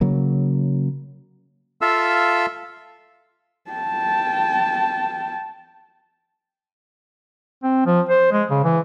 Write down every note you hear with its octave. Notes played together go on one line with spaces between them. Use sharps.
C#3 F#3 A#3
F4 A4 E5 F5 E6
G5 A5
C4
F3
C5
G#3
C#3
E3